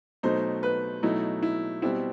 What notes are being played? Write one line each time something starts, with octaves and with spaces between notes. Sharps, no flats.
B2 F#3 A3 D#4 C5
B4
B2 F#3 A3 D#4 E4
E4
B2 G3 C4 E4